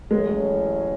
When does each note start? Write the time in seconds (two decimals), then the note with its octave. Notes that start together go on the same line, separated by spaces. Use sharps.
0.11 A1 A2 F#3 G#3 C#4